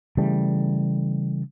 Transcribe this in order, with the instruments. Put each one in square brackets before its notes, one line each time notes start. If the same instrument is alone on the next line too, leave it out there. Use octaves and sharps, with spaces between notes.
[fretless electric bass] C#3 E3 G3 A3